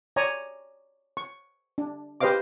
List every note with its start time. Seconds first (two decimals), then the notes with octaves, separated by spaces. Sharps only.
0.16 C#5 D5 G#5 A#5
1.17 C#6
1.78 D4
2.20 G4 B4 C5 D#5 F5 D6